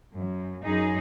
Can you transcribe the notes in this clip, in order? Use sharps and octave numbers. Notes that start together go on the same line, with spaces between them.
F#2
F#2 D#4 G#4